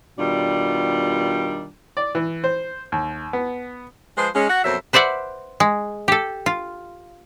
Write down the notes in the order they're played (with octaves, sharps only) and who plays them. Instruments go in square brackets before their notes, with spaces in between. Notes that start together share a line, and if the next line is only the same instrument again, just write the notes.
[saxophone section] B2 D#3 G3 D4 F4
[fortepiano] D5
E3
C5
D#2
B3
[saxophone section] F3 G#3 G#4 B4 C5
G#3 C#4
F#4 F#5
F2 B2 F#3 A#3 C5 E5
[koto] B4 C5 D5 E5 F#5
G#3
G4 A4
F4